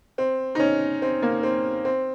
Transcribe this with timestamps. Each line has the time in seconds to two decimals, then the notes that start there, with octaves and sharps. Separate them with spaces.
0.18 C4
0.55 D#4
0.60 C#4
1.02 C4
1.22 A#3
1.43 C4
1.85 C4